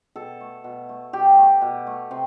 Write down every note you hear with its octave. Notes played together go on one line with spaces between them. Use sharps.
B2 A4
A3
B2
A3
B2 G4
A3
B2
A3
C3